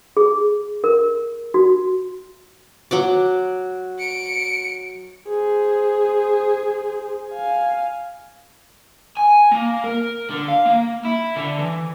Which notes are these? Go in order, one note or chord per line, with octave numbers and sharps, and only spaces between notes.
G#4
A#4
F#4
F#3 F#5 D6
C#7 D7
G#4 C5
F5 G#5
G#5
A#3
A#4
D3
F5
A#3
E4
D3
E3